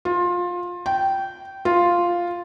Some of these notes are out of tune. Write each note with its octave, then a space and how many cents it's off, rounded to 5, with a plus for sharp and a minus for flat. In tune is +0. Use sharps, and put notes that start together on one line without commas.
F4 +20
G5 -15
F4 +0